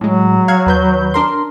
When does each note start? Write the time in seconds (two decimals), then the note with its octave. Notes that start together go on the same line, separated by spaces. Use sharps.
0.01 A2 F#3 G#3
0.48 F5 F#5 G#6
0.66 D#2 B4 G6
1.14 D4 A#4 C6